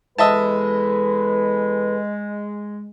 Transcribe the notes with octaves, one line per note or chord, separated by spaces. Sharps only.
E2 G#3 A4 B4 D#5 E5 A5